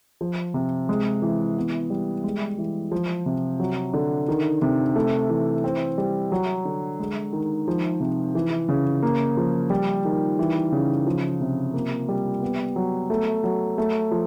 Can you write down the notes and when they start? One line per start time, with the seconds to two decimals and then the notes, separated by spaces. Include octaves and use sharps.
0.21 F3
0.54 C3
0.89 G#3
1.22 E3
1.57 B3
1.90 G3
2.24 G#3
2.58 E3
2.92 F3
3.26 C3
3.60 F#3
3.94 D3
4.28 D#3
4.62 C3
4.96 A3
5.29 E3
5.64 C4
5.98 G3
6.32 F#3
6.65 D3
7.00 G#3
7.33 D#3
7.68 F3
8.00 C3
8.35 E3
8.69 C#3
9.02 A#3
9.37 F3
9.70 G3
10.05 D#3
10.39 E3
10.72 C#3
11.06 F3
11.41 C3
11.74 A#3
12.09 G3
12.42 B3
12.76 F#3
13.10 A3
13.44 F#3
13.78 A3
14.11 F3